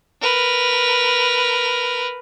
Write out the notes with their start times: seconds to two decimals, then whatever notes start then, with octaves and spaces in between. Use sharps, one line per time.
0.21 A#4 B4